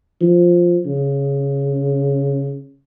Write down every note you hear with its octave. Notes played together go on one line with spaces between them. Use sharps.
F3
C#3